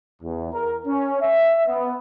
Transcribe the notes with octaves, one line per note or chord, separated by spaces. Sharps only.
E2
A#4
C#4
E5
B3